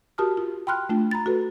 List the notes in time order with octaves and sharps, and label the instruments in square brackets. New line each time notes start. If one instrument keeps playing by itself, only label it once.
[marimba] F#4 G4 A#4 A5 D#6 F6
F4
G5 B5 C6 F6 F#6
A3 D4 F4 G5
A#5 B5 A6
F#4 A4 B4